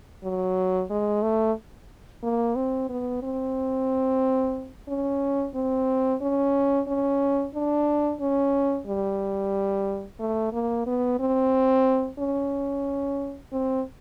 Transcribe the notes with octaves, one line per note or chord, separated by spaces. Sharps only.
F#3
G#3
A3
A#3
C4
B3
C4
C#4
C4
C#4
C#4
D4
C#4
G3
A3
A#3
B3
C4
C#4
C4